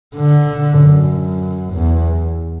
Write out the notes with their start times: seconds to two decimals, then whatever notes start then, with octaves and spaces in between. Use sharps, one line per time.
0.16 D3
0.80 F#2
1.74 E2